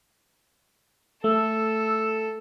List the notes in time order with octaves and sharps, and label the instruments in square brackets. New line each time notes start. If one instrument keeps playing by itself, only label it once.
[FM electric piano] A3 [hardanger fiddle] A4 [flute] E6